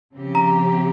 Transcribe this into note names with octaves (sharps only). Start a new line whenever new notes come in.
C#3 F3 C4 G4
A#5